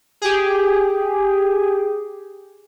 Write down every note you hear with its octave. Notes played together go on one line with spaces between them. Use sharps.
G4 G#4